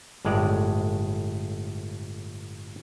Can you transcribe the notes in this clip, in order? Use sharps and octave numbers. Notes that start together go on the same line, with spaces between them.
G1 A2 G#3 D5